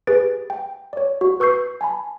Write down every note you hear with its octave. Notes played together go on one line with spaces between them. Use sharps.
G4 G#4 B4 A6 D7
G5
C#5 D5
F#4
B4 C#6 E6 G6 C7
G#5 A5 B5